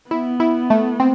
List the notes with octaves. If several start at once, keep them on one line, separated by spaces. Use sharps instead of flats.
B3 E4
E4
A3
C4